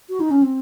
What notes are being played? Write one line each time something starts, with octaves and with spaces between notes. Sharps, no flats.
F#4
D#4
C#4
C4